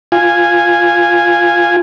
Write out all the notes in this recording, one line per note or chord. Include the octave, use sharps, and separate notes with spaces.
F4 G#5